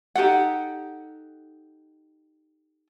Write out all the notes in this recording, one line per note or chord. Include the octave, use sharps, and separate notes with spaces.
D#4 G4 A4 F#5